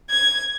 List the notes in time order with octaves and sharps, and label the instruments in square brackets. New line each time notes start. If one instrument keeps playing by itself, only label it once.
[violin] G#6